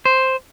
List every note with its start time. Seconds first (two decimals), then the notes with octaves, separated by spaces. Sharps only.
0.05 C5